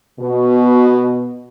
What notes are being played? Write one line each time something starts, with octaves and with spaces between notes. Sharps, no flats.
B2